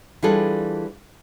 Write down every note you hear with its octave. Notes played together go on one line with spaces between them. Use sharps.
E3 G3 D4 F4 G#4 A4